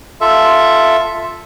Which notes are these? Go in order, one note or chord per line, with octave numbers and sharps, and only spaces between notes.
F4 A4 E5